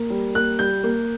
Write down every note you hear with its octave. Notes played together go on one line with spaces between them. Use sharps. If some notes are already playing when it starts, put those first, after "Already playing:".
Already playing: A#3
G3
A#3 F#6
G3 G6
A#3